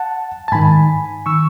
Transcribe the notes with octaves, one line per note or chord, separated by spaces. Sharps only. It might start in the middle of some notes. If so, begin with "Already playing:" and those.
Already playing: F#5 A5
A5
G#2 D#3 G#5 B5
D#3 C#6 E6